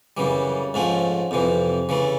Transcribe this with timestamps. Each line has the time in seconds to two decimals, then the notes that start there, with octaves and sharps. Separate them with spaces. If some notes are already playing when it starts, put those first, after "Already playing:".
0.17 F#2 C#3 E3 G3
0.74 G#2 F3 A3 C#4
1.31 F2 C3 E3
1.89 C#3 E3 A3